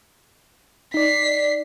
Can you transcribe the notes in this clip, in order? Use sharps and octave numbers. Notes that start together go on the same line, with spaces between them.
D#4 D5 B6 C7